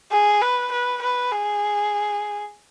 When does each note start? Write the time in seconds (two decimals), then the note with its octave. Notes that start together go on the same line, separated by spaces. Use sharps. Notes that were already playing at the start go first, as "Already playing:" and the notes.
0.12 G#4
0.42 B4
0.71 B4
1.02 B4
1.32 G#4